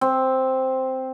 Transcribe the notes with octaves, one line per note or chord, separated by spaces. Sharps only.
C4